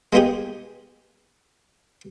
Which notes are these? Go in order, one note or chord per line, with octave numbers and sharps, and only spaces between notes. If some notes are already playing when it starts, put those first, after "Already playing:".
G#3 A#3 B3 D#4 G4 G#4